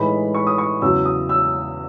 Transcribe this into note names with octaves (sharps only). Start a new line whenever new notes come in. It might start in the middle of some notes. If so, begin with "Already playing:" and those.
Already playing: A2 E3 G#3 D#4 B5
C#6
D#6
C#6
E2 C#3 F#3 E6
D#6
E6